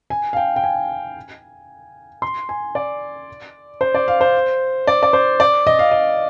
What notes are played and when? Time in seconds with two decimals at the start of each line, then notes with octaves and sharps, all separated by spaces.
0.10 G#5
0.33 F5
0.37 G5
0.56 G5
0.64 G#5
2.22 C6
2.49 G#5
2.75 D5
3.81 C5
3.95 D5
4.08 F5
4.21 C5
4.87 D5
5.03 D5
5.13 C5
5.40 D5
5.67 D#5
5.79 F5
5.91 D#5